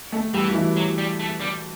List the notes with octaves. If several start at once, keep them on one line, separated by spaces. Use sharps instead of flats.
A3 A4
E3 G3 G4
F#4
E3 E4
F#3
G3
A3
G3